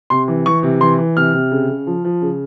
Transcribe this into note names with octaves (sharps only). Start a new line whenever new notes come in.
C3 C6
E3
E3 C#6
C3
E3 C6
E3
C3 F6
C3
C#3
C#3
F3
F3
C#3